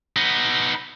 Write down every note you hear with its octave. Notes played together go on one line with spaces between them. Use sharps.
B3 D#4